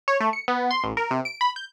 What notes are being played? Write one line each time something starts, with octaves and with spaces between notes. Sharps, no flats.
C#5
A3
C#7
B3
C6
A1
A#4
C3
D7
B5
G6